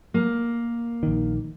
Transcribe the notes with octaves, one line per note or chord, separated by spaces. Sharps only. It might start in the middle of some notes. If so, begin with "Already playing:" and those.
A#3
A#1 D#3